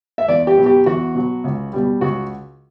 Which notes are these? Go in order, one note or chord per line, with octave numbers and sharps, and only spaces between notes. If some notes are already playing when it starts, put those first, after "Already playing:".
E5
E2 D5
G4
B2 F#3
G4
E2 F#4
B2 F#3
C#2
B2 G3
C#2 F#4